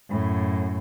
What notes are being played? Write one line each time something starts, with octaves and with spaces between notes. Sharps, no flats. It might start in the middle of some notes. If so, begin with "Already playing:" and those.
F#2 A2